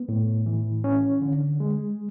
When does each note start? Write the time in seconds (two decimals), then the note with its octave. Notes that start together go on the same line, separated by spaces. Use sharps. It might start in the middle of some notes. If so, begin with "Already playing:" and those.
Already playing: B3
0.09 A2
0.46 E3
0.84 C#4
1.22 D3
1.60 G#3